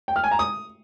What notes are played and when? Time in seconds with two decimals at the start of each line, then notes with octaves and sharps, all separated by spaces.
0.08 G5
0.16 F6
0.24 G#5
0.31 A#5
0.39 D#6